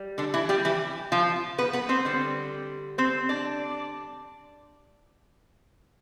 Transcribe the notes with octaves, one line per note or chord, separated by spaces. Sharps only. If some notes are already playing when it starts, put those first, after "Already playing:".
Already playing: G3
D3 D4
E3 E4
G3 G4
E3 E4
F3 F4
B3 B4
B3 B4
C4 C5
D3 G3
C4 C5
D4 D5